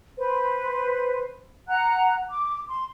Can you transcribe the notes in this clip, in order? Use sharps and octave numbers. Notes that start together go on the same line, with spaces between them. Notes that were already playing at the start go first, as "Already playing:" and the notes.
B4 C5
F#5 A#5 F#6
D6
C6